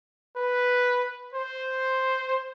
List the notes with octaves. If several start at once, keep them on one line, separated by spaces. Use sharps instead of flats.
B4
C5